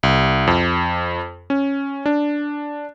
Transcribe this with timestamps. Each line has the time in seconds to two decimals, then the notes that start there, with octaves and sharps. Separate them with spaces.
0.03 C2
0.47 F2
1.50 C#4
2.06 D4